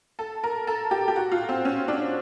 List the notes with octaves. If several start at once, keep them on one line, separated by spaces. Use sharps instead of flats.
A4
A#4
A4
G4
G4
F#4
F4
C4
C#4
D4